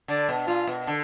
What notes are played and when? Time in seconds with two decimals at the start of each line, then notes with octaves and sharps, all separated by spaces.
0.08 D3 D5
0.29 B2
0.47 A#2 F4
0.67 B2
0.87 D3